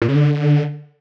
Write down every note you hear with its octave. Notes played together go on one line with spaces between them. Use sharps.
A#2
C#3
D3